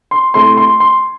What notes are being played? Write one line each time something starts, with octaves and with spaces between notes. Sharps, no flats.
C6
C3 A3 E4 C6
C6
C6